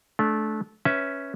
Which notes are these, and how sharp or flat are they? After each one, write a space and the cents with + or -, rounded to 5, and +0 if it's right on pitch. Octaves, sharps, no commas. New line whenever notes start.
A3 -20 D4 -5
C#4 +0 B4 +0 E5 -10